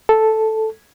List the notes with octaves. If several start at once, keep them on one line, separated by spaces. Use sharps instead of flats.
A4